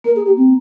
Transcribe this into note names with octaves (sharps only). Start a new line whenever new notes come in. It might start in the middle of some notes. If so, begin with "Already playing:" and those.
A#3 A#4
G#4
G4
C4